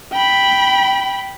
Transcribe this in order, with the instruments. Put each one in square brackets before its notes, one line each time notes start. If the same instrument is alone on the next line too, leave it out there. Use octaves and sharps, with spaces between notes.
[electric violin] G5 B5